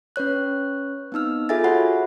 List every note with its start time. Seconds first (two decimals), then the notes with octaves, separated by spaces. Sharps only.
0.16 C#4 B4 C#5 F#6
1.12 B3 C4 D#4 E6 F6
1.49 F4 G#4 A4 E5 G#5 A6
1.64 F#4 C#5 E5 F#5 B5